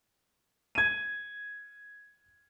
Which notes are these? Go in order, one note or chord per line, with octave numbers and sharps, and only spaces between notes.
G#6 D#7